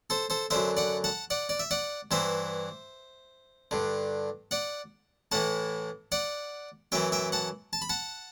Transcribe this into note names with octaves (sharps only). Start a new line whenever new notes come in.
A4 C5
A4 C5
F#2 D3 C5 E5
D5 F#5
F#5 A5
D5 F#5
D5
E5
D5 F#5
G2 E3 C5 E5
G2 D3
D5 F#5
A2 E3 F#5 A5
D5 F#5
F#2 E3 E5 G5
E5 G5
F#5 A5
A5
B5
F#5 A5